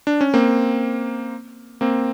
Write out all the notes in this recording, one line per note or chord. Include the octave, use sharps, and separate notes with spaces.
D4
C#4
A#3 C4
A#3 C4